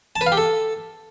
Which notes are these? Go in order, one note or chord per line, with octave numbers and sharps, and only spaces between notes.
A5
B4
F5
G4
A4